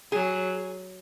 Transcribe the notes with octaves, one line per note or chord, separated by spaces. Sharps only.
F#3 G#4